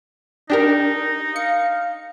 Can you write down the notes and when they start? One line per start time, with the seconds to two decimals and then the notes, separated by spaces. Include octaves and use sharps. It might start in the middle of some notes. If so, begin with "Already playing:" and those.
0.50 D4 D#4 G4 A#4
1.36 F5 C#7